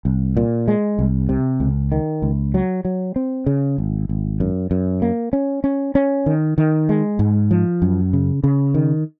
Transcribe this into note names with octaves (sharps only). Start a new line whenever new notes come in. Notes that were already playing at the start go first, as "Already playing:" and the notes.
C2
A#2
G#3
C2
C3
C#2
D#3
C#2
F#3
F#3
C4
C#3
G#1
G#1
F#2
F#2
A#3
C#4
C#4
C#4
D#3
D#3
G#3
G#2
F3
F#2
C#3
C#3
D#3